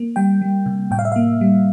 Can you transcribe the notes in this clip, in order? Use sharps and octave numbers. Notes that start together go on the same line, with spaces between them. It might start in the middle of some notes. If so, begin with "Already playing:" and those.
Already playing: A#3
G3 G5
G3
C3
A2 G5
F5
E5
A#3 F5
G3